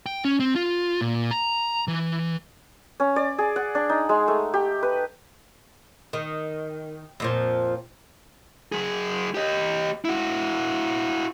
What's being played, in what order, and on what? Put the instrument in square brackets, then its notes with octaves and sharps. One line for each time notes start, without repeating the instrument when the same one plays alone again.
[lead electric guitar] G5
C#4
C4
F4
A#2
A#5
E3
[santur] C#4
D5
G#4
F#5
D4
D#4
G#3
A3
G4
B4
[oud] D#3
F2 A#2 F3
[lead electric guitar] F#3 G#4
G4 D#5
E4 F#4